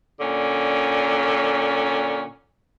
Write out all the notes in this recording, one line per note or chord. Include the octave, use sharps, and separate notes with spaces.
A#2 D3 C#4